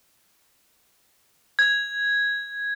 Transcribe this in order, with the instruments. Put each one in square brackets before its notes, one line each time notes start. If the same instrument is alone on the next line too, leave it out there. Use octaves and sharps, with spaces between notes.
[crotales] G#6